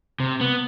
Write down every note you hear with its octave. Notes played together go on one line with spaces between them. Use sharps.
C3
B3